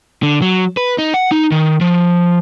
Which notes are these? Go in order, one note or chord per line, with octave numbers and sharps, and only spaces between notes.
D3
F#3
B4
D#4
F#5
D#4
D#3
F3